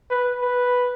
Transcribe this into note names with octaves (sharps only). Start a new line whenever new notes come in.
B4
B4